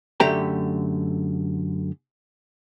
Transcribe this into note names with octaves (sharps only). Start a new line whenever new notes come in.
F#2 D3 A3 G4 G5 A#5